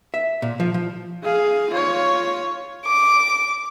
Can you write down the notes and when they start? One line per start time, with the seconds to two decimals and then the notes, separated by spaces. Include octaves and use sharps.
0.14 E5
0.42 A#2
0.60 F3
0.74 F3
1.23 G#4 F5
1.71 F4 C#5
2.85 D6